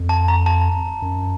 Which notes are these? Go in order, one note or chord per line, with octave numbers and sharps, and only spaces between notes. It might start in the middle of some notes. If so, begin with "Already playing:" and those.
Already playing: F2
A5
A#5
A5
F#2